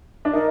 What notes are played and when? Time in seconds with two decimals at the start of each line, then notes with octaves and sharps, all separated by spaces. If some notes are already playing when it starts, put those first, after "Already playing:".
0.25 D4
0.33 D#4 A#4